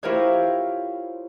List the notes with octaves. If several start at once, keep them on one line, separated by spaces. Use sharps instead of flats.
E4 F4 G4 A#4 C5 C#5